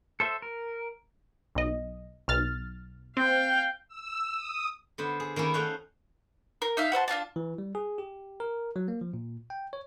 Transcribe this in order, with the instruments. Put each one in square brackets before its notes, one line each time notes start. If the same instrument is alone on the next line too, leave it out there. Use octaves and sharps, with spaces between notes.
[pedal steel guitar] A4 C5 E5
A#4
[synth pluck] B1 D#5
B1 F6 A6
[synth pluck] C4 [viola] F5 G5
[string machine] E6
D#6
[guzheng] D3 B3 C5
G#4
D#3 A#3 C#4 E4
A3 D#4 C5 C#5 F5 F#5
[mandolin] A#4
D#4 E5 F5
F#4 C5 E5 A5
D4 F4 F#4 A5
[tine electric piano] E3
G3
G#4
G4
A#4
F#3
A#3
F3
A#2
G5
C#5